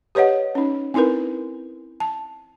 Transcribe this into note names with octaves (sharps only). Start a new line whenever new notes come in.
G4 B4 C#5 D#5 F#5
C#4 D#4
C4 D#4 E4 A#4 B4
A5